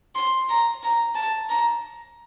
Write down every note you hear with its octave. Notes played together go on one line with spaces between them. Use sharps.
C6
A#5
A#5
A5
A#5